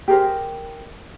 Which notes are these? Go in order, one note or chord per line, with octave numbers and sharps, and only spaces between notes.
G4 G#4 A#4 C5